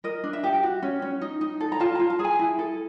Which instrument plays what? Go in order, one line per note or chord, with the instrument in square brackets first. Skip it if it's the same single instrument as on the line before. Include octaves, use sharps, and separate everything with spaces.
[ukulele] A#4 D#5
D4
E5
G4
F#4
C#4
C#4
D#4
D#4
A4
A#5
F4 A5
F4 A#5
A5
G#4
G#5
E4
A4